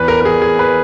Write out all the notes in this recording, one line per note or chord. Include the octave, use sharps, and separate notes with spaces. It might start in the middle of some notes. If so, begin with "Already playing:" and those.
Already playing: E2 B4
A#4
A#4
E2 G#4
G#4
B4